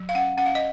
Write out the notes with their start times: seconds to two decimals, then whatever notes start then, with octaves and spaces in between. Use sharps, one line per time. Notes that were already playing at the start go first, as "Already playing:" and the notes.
Already playing: F#3
0.09 F5
0.15 C#4 F#5
0.37 C#4 F#5
0.46 F5
0.55 D#5